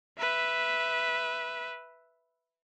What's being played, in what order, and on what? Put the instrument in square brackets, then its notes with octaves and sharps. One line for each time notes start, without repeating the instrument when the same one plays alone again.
[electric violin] B4 E5